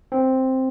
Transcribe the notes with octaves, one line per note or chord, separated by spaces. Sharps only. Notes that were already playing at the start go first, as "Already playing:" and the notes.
C4